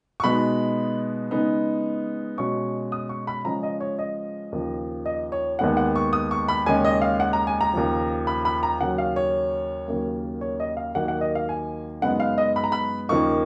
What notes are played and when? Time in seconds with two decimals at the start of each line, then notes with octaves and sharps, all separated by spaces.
0.20 C#6
0.24 B2 G#3 B3 D#4 B5
1.31 C#3 G#3 B3 D#4
2.38 B2 G#3 C#4 C#6
2.92 D#6
3.09 C#6
3.27 B5
3.45 C#3 F3 G#3 C#4 A#5
3.63 D#5
3.81 C#5
3.99 D#5
4.52 D#2 C#3 F3
5.06 D#5
5.32 C#5
5.59 D#2 D#3 G#3 B3 D#4 F#5
5.77 F#5
5.96 C#6
6.13 D#6
6.31 C#6
6.48 B5
6.66 D#2 C#3 G#3 C#4 G#5
6.84 D#5
7.02 F5
7.20 F#5
7.33 A#5
7.47 G#5
7.61 A#5
7.74 D#2 C#3 F3
8.27 B5
8.45 B5
8.63 A#5
8.81 D#2 C#3 F#3 C#4 F#5
8.98 F5
9.16 C#5
9.88 D#2 C#3 F#3 A#3
10.41 C#5
10.60 D#5
10.77 F5
10.95 D#2 D#3 F#3 A#3 F#5
11.08 F#5
11.21 D#5
11.35 F5
11.49 G#5
12.02 F#2 C#3 G#3 B3 D#4 F#5
12.20 F5
12.38 D#5
12.56 B5
12.64 A#5
12.72 B5
13.09 D#2 C#3 F3 A#3 D#4 C#6